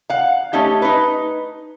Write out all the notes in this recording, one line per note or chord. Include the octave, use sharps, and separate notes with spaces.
F5 F#5
A3 C#4 D#4 G4
D#4 B4